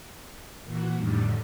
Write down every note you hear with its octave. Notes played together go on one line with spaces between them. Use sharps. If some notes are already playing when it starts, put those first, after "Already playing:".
A#2 E3 F#4
F2 A2 D3 D#3 G3